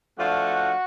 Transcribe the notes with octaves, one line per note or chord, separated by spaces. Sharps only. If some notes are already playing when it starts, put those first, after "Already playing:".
F3 A3 D4 F4 F#4 F#5